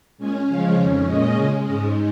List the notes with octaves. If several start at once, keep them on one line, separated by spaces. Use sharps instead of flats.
A#2 G#3 C#4 G#5
C#3 F3 G#3 C#4 F5
F2 D#3 C#4
A#2 G#3 C#4 D#5
C#3 G#3 C#4
G#2 G#3 C#4 D#5